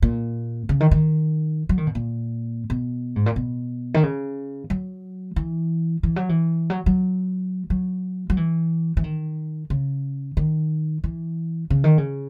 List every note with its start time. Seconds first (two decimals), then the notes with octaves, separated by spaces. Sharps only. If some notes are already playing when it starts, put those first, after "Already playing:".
0.02 A#2
0.69 C#3
0.80 D#3
0.91 D#3
1.69 F#3
1.78 D#3
1.87 B2
1.95 A#2
2.70 B2
3.16 G#2
3.26 A#2
3.36 B2
3.94 D#3
4.03 C#3
4.70 F#3
5.36 E3
6.03 E3
6.16 F#3
6.29 E3
6.70 F#3
6.86 F#3
7.70 F#3
8.30 F#3
8.37 E3
8.97 E3
9.04 D#3
9.70 C#3
10.37 D#3
11.04 E3
11.70 C#3
11.84 D#3
11.98 C#3